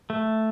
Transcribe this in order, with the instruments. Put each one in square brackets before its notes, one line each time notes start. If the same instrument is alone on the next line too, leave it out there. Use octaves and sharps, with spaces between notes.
[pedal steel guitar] A3